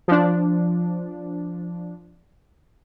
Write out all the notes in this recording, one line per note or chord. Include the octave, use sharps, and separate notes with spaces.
F3 D4